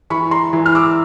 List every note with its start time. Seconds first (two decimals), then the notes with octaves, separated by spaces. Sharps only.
0.10 E3 B5 C#6
0.31 A#5 C6
0.53 E3
0.66 F6
0.75 D6 E6